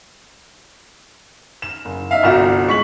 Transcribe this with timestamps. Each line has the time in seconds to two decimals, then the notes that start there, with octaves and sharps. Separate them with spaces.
1.62 E7
1.85 F#1
2.11 D#4 E5 F5
2.23 G1 C2 F4 F#4 E7
2.67 G#3 C#6 B6 F#7